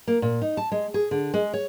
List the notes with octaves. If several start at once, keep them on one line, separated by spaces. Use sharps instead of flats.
A#3
A#2
D#4
A5
G#3
G#4
D3
G#3
C#5